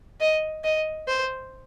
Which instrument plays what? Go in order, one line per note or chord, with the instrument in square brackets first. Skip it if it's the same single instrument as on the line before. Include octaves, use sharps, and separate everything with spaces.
[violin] D#5
D#5
C5